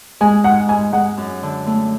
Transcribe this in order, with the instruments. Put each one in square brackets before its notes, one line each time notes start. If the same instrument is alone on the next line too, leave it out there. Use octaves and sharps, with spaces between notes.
[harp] G#3 [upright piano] G#5
[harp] G#2 [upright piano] F#5
[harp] G#2 [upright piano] G#5
[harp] G#3 [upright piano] F#5
[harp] F#2
D3
A3